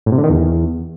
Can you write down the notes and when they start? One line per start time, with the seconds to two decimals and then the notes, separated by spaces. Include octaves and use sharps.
0.06 A2
0.12 C3
0.18 D3
0.24 D#3
0.29 E2